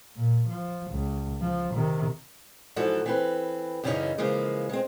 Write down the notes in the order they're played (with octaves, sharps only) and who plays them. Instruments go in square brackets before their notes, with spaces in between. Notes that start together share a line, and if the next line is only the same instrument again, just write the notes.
[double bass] A#2
F3
C#2
F3
C3 D#3
[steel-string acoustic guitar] G#2 E3 F3 F#4 A4
E3 C4 B4
F#2 C#3 E3 G3 C#4 D#4
C#3 E3 F3 G#3 A#3
G#3 C4